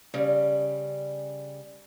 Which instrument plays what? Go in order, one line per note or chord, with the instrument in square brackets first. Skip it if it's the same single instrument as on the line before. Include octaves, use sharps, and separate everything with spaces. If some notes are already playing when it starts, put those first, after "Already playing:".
[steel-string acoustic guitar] C#3 G3